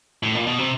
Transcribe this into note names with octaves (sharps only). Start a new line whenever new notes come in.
A2
A#2
B2
C3